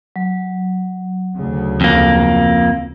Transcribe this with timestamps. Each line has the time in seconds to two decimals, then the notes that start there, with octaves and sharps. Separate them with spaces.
0.16 F#3
1.36 D2 C#3
1.81 F2 A#3